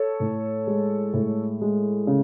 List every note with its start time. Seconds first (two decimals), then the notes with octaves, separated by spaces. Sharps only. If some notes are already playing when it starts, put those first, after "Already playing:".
Already playing: A4 C#5
0.20 A2
0.67 G#3
1.13 A2
1.61 G#3
2.07 C#3